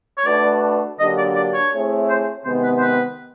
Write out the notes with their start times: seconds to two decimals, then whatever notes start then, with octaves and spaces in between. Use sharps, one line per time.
0.18 C#5
0.26 A3 D4 F#4 B4 D5
0.99 D3 F#3 A#3 D4 G4 D#5
1.18 D5
1.36 D5
1.54 C#5
1.73 A3 C4 E4 G#4 C#5
2.09 C5
2.45 C3 D#3 G#3 B3 C5
2.64 B4
2.78 C5
2.81 B4